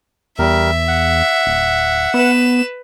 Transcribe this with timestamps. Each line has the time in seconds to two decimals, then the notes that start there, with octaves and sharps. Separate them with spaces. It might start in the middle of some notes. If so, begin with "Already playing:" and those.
0.39 E2 G3 A#4 E5
0.88 F#5
1.46 D1
2.14 B3 B4 E7